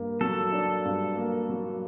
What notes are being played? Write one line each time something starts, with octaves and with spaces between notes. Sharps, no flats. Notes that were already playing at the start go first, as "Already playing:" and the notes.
Already playing: G2 A#3
F#3 A4
D4
G2
A#3
F#3